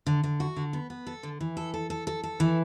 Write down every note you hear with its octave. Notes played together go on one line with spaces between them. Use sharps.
D3
D3
F#4
D3
B3
B3
A4
D3
E3
A4
A4
A4
A4
A4
E3